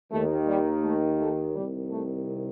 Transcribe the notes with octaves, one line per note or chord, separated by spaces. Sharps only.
D#2 D#3 A3
G3
A3
A3
C2 C3 D#3 G3
A3